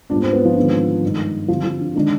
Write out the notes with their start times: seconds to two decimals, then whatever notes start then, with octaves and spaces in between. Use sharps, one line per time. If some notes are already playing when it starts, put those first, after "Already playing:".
0.10 G#2 G3 B3 D4 F4
0.22 C4
0.33 B3
0.45 F3
0.56 G#2 D3 D#3 B3 F4 G#4
1.02 G2 D#3 G#3
1.48 D3 F3 G3 C4
1.64 F3
1.80 D3
1.95 D3 D#3 G#3 D4